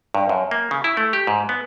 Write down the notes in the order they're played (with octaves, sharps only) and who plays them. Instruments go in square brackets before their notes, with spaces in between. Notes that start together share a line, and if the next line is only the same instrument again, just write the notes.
[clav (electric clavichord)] G2
F#2
A#3
C#3
E4
A3
G4
G#2
B3